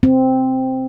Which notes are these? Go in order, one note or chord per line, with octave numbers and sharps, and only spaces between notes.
C4